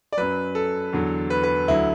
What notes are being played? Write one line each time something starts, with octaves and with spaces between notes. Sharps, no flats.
D5
F#2 F#3 B4
A4
E2 D3 F#3
B4
B4
D2 D3 F#3 E4